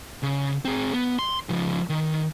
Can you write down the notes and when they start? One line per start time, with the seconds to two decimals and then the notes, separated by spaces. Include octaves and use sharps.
0.23 C#3
0.65 C4 G#4
0.94 B3
1.19 C6
1.49 C#3 F3
1.89 D#3